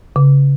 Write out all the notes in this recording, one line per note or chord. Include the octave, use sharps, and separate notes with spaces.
C#3